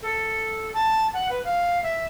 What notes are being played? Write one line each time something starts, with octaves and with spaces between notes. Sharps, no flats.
A4
A5
F#5
B4
F5
E5